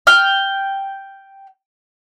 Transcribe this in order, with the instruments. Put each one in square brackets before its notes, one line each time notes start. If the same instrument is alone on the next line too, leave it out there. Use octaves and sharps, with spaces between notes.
[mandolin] G5 F6